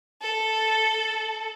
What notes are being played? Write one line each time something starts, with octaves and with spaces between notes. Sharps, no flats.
A4